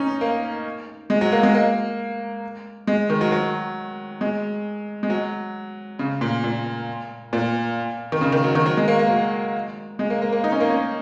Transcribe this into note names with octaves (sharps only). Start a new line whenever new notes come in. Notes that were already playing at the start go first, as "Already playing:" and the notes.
Already playing: C#4 D#4
A#3
G#3
F#3
A#3
G#3
A#3
G#3
D#3
F#3
F#3
G#3
G#3
F#3
C#3
A#2
A#2
A#2
D#3
C#3
D#3
F#3
D#3
F#3
G#3
A#3
A#3
F#3
G#3
A#3
A#3
A#3
D#4
C#4
A#3
C#4